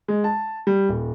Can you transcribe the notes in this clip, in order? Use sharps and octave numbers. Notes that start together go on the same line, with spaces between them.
G#3
A5
G3
D#1